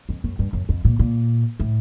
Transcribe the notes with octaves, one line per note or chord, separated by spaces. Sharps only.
F2
F#2
G2
F#2
F2
A#2
A#2
A2